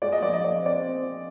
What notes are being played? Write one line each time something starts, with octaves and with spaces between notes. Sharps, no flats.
G#3 D5
D#5
A#1 D5
D#5
A#1 D5
D#5
C4
D5
C4
C4